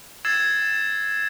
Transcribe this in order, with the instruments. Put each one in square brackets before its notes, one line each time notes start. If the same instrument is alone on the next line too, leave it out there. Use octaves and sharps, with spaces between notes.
[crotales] E6 G#6 A6 C7 E7